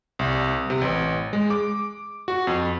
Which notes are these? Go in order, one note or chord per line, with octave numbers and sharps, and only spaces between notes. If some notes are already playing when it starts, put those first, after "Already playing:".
C2
C3
A1
G#3
D6
F#4
F2